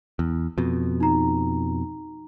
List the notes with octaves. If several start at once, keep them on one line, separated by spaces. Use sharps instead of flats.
E2
F2 B2
D#4 A#5